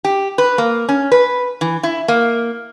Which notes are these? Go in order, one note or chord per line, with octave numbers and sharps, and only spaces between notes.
G4
B4
A#3
C#4
B4
E3
E4
A#3